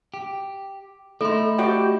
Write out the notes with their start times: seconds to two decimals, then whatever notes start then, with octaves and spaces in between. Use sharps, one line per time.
0.14 G4
1.21 A3 D#4 E4 A4 C6
1.59 F#4 G4 D5 G5